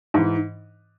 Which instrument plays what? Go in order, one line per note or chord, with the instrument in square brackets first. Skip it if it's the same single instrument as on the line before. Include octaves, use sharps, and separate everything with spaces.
[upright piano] G#2 E3